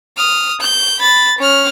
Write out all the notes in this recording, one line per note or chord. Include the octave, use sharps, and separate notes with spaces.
D#6 F6
G6
B5 A6
C#4 F6